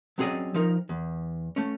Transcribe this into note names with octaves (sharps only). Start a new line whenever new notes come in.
F#3 C4 C#4 G#4 D5 D#5
F3 D#4 A#4
E2
A3 C#4